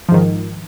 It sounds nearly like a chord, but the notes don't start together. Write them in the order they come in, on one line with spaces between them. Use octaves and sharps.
F3 G#2 D#3